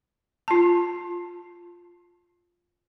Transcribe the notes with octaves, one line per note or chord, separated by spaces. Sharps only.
F4 A5